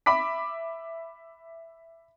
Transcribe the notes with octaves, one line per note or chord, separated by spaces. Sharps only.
E5 B5 D6 B6